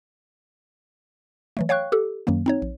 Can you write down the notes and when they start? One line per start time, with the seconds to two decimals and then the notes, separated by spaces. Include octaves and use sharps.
1.57 E3 F#3 A3
1.69 C#5 F5 G5 C#6 F#6
1.92 G4 A4
2.27 F#2 D#3 F#3 A#3
2.46 C4 D#4 C#5
2.62 A#1